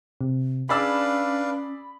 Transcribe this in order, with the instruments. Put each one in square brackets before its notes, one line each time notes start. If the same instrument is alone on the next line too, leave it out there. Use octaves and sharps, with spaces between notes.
[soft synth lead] C3
[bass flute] C#4 [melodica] D4 B4 F5 [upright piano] G#4 D5 E6 [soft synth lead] B5